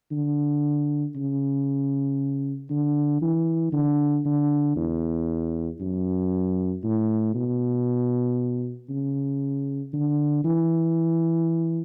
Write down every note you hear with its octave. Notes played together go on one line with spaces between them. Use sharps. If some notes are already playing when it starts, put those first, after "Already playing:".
D3
C#3
D3
E3
D3
D3
E2
F#2
A2
B2
C#3
D3
E3